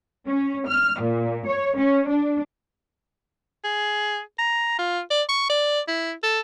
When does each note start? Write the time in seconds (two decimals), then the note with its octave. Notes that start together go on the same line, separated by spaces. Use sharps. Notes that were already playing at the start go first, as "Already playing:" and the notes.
0.27 C#4
0.67 F6
1.01 A#2
1.46 C#5
1.77 C#4
2.08 D4
3.64 G#4
4.39 A#5
4.79 F4
5.11 D5
5.29 C#6
5.50 D5
5.88 E4
6.23 A4